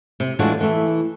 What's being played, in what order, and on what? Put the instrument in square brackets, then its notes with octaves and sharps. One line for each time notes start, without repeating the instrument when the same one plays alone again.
[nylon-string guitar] C3
A2 E3 G#3 D4 F4 F#4
E3 A3